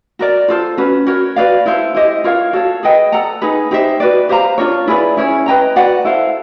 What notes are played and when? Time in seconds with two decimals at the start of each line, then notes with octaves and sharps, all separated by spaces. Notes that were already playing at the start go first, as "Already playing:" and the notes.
0.19 F#4 A#4 D5
0.48 F4 A4 C5
0.77 C#4 F#4 B4
1.06 F#4 A#4 C#5
1.36 F#4 B4 D5 F5
1.66 E4 A4 C5 F5
1.95 E4 G4 C5 D#5
2.24 F4 A#4 C#5 F5
2.53 F#4 A4 C#5 F5
2.83 G#4 B4 D#5 G5
3.12 A4 D5 F#5 A#5
3.41 D#4 G#4 B4
3.71 D#4 G4 C5 E5
4.00 F#4 B4 D5
4.29 G4 C5 F5 A#5
4.58 D4 F4 A#4 C#5
4.88 E4 G#4 B4 D5
5.17 C#4 E4 G#4 C#5
5.46 B4 D#5 G5 A#5
5.76 F#4 B4 D5 F#5
6.05 E4 A4 C5 F5